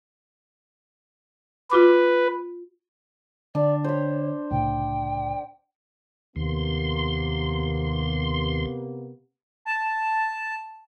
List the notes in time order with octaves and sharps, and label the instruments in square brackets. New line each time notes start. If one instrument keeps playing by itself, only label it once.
[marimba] F4 F#4 D6 [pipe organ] B4
[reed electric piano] D3 [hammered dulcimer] D4 [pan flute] D5
[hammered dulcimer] C5 B5 [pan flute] C#5
[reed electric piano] C2 A2 C#3 [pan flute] G5
[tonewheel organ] D#2 C6 [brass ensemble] C3 A#3 B3
[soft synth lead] A5